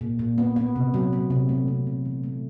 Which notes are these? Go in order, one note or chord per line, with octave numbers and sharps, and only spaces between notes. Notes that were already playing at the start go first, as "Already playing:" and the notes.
A#2
A#2
B3
B3
C3
F#3
F#3
C3
A3
C3
C3
E3
A3